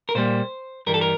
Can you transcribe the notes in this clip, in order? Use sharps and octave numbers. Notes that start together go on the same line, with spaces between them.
A#4
A#2 G3 A#3 C5
G2 E3 G3 A#4
A4
A#4